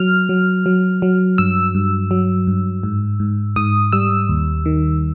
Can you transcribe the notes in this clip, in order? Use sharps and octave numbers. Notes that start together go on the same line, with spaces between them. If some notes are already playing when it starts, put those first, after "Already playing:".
Already playing: F#3 F6
F#3
F#3
F#3
G2 E6
G2
F#3
G2
G#2
G#2
G#2 D#6
G3 E6
D#2
D#3